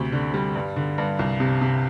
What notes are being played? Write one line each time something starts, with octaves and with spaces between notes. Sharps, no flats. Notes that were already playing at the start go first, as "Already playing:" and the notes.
Already playing: D2 C3
D3
G3
G2
D3
G2
C2
C3
C3